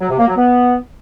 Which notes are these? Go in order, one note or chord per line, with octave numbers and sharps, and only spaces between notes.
F#3
C3
A#3
F#3
B3